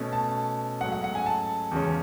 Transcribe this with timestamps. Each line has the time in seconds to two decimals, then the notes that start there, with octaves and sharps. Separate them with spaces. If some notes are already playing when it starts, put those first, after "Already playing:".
Already playing: B2 A3 C#4
0.13 A5
0.81 G#2 F#3 A3 C#4 F#5
0.92 F#5
1.04 F#5
1.15 G#5
1.26 A5
1.71 E2 C#3 G#3 C#4